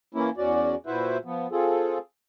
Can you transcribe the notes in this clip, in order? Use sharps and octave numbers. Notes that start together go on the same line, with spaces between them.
E3 A#3 C#4 E4
E2 C#4 F#4 D5
A#2 E4 F#4 B4 C5 E5
F3 B3
C4 F4 G#4 A4